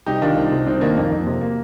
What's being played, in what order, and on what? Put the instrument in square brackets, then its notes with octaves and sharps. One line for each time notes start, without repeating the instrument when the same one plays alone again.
[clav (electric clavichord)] C2 [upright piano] D#4 G4
[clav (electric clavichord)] D#3 [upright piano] D4 F4
[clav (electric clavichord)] C2
C3
[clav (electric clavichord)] C2 [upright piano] C4 D#4
[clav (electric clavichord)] D#3 [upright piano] A#3 D4
[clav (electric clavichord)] F2 [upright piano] A#3
[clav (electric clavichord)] F2
C3
[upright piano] A#3